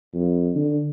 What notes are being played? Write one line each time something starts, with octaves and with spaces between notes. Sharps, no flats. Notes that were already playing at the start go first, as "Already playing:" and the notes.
F2
D3